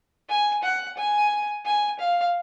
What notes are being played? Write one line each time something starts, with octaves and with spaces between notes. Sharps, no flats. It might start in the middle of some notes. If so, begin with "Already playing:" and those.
G#5
F#5
G#5
G#5
F5